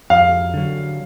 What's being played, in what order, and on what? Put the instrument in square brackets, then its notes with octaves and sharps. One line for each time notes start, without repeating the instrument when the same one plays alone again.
[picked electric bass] F2 [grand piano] F5
[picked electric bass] D3 F#3